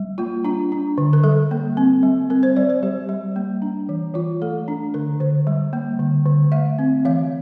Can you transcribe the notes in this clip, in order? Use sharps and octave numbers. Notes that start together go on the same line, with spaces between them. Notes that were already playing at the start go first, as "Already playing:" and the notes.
Already playing: G3
A#3 F4
D4 F4
D4
D3
A#4
G3 A4
A#3
C4
G3
C4 A#4
C5
G3 D5
C5
G3 G4
G3
A#3
D4
E3
E3 F4
A3 A4
D4
D3 A#4
D3 C5
G3
A#3
D3
D3
A3 E5
C4
E3 F5